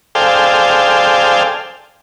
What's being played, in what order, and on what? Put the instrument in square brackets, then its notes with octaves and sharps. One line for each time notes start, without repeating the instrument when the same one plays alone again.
[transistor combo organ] G#4 A4 C5 D5 F5 G5